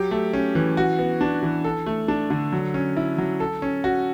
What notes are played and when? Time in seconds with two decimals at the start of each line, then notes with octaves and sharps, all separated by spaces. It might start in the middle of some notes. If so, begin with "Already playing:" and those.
Already playing: F#3 G4
0.11 A3
0.33 C#4
0.55 E3
0.77 F#4
0.99 B3
1.21 D4
1.43 E3
1.64 A4
1.86 A3
2.08 D4
2.30 D3
2.53 F#3
2.74 C#4
2.96 E4
3.18 F#3
3.40 A4
3.62 C#4
3.84 F#4